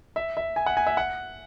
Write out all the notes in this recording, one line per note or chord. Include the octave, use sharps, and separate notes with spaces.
E5
E5
G#5
F#5
G#5
E5
F#5